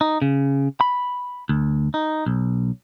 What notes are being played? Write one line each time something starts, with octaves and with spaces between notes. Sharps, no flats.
D#4
C#3
B5
D2
D#4
B1